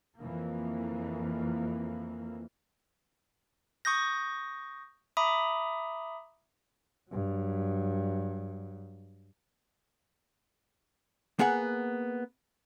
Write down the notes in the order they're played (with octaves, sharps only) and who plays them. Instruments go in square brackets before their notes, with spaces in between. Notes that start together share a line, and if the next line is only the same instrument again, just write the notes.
[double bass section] F2 E3 A#3
[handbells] C#6 D#6 G6 A#6
E5 A#5 B5 D6 D#6
[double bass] G2 F#3
[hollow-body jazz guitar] A#3 B3 G#4 F#5